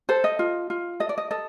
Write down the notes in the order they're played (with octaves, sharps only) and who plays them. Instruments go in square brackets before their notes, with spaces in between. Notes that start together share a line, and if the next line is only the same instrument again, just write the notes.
[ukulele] A4 C5
D#5
F4
F4
A4 D#5
D5
D#5
A4 D#5